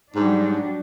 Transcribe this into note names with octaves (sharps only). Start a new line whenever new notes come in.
G#2 F#3 G3 D4